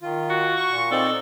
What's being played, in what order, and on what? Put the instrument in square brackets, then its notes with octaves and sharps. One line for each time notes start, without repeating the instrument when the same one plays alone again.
[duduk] D#3 [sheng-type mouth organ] F4
[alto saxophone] F#4
[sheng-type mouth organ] C#6
[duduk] A#2
[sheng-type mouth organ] C4 D#4 D5 [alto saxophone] A4